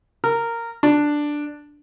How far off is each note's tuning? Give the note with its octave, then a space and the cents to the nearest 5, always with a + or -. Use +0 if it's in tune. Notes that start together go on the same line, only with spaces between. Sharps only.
A#4 -10
D4 +5